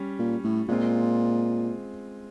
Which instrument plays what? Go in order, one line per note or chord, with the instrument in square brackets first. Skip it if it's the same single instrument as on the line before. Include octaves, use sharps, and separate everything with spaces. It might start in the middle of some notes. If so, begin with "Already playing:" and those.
Already playing: [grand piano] G3 C#4
[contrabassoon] A#2
A2
[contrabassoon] A#2 [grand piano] G#3 C4 F4